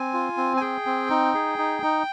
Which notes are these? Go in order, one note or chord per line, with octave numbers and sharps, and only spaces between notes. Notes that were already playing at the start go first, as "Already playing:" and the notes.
Already playing: C4 G#5
F4
C4
G#5
G#4 G5
C4
D#4
G#4
D#4
D#4